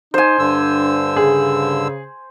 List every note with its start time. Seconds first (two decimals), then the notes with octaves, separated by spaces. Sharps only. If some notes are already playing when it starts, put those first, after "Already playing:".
0.14 D#4 C5 G#5
0.39 G2 D3 D4 E6
1.16 C#3 G#4